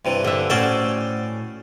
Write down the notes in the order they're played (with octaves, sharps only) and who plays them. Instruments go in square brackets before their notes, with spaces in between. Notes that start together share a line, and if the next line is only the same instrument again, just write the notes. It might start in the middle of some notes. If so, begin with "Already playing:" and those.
[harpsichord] G2 C3 E3
[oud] D3 E5
[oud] A2 C#4 F#4 [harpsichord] C5 D5 G5